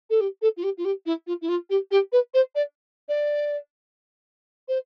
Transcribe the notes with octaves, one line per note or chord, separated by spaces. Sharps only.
A4
G4
A4
F4
G4
F4
G4
E4
F4
E4
F4
G4
G4
B4
C5
D5
D5
C5